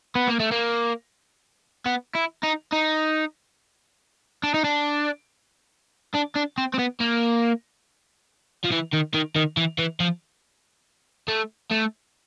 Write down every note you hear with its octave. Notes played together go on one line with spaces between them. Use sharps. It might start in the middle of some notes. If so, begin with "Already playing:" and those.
B3
A#3
A3
A#3
B3
E4
D#4
D#4
D4
D#4
D4
D4
D4
C4
C4
B3
A#3
F3
E3
D#3
D#3
D#3
E3
E3
F3
A3
A3